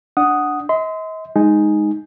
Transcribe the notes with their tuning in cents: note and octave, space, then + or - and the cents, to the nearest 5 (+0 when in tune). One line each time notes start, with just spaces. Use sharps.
D4 +0 F#5 +0 D#6 +0
D#5 +45 C6 -30
G#3 +0 D#4 +0 G#5 +0